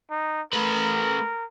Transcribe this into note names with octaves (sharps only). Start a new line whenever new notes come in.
D#4
A3 A#4 B4